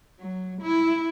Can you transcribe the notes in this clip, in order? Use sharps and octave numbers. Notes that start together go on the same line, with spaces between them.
F#3
E4